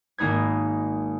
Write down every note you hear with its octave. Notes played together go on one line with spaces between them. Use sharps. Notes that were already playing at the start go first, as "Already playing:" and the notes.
G#1 A#3 D#4 B4 G#6